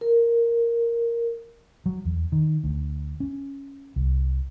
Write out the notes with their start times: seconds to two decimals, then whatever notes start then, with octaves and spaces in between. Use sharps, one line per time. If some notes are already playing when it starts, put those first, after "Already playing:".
0.01 A#4
1.86 F#3
2.05 E2
2.32 D#3
2.64 D2
3.20 C#4
3.96 C2